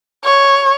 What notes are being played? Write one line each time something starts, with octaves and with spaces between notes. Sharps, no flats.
C#5